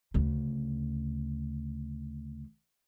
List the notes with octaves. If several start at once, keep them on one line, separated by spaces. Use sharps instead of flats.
D2 C#3